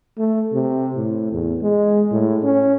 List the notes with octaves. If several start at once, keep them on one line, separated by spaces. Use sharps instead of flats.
A3
C3
A2
E2
G#3
A2
C#4